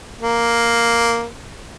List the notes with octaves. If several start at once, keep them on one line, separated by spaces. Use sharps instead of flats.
A#3